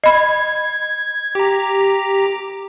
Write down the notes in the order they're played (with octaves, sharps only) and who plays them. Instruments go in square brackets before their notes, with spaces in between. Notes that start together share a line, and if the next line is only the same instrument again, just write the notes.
[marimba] D#5 B5 [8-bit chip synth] G#6
[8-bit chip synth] G4 A#5